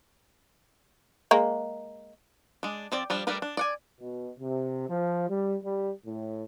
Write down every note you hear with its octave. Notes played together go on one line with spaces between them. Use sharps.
G#3 A#3
G#3 D4
F3 C4 D5
F3 G3 D4
G3 A3 D4 A#4 B4
D4
D5 F#5 G#5
B2
C3
F3
G3
G3
A2